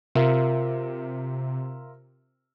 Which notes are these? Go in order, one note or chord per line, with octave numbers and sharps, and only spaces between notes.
C3 F4 A#4 E5